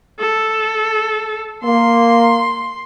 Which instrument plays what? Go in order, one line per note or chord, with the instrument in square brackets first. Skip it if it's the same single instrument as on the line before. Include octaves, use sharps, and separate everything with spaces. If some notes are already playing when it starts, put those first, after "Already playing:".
[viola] A4
[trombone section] A#3 [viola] C6